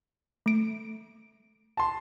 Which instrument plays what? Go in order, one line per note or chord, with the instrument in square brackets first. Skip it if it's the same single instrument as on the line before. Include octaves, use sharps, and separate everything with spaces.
[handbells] A3 D7
[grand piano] A5 C6